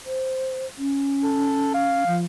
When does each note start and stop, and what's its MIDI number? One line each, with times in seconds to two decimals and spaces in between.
0.06 0.66 72
0.78 2.04 61
1.24 1.70 69
1.74 2.17 77
2.07 2.25 53